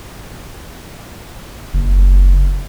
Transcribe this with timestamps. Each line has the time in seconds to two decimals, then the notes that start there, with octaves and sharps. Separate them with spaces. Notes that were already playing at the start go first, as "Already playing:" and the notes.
1.74 F#1